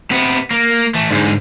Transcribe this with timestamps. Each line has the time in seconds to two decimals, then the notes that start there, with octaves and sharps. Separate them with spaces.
0.11 C3 B3
0.51 A#3
0.95 E3 A3
1.11 G#2 D3